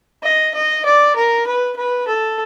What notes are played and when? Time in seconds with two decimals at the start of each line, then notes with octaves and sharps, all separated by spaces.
0.23 D#5
0.54 D#5
0.85 D5
1.16 A#4
1.47 B4
1.77 B4
2.08 A4